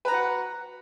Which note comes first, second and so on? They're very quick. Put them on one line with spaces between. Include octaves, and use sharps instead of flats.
B4 A#5 F#4 F#5